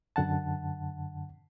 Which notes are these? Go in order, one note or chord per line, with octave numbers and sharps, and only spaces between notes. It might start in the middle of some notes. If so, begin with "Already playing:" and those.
F#2 D3 F#5 A5